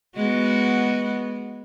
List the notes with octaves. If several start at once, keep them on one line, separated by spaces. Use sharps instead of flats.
G#3 B3 F#4